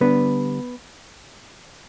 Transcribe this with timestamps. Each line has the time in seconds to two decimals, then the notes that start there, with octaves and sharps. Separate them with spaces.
0.01 D3 G3 B3 D4 B4